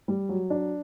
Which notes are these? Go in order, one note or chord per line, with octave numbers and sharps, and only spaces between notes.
G3
F#3
D4